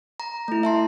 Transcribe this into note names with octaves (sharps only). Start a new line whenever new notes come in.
A#5
A3 E4
E5 A5 C6